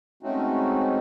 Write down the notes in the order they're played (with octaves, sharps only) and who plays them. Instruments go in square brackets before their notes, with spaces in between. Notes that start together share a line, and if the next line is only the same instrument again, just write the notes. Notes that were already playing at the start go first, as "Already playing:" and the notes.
[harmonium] G#3 A3 C4 C#4 D#4 F#4